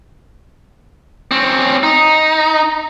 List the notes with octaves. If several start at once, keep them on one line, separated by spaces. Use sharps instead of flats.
C4 C#4
D#4